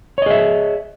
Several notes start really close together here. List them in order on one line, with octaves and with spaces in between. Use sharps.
C#5 D#5 G#4 E5